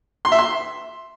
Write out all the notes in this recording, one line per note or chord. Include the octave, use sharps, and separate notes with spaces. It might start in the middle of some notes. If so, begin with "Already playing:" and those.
C6
E5
C6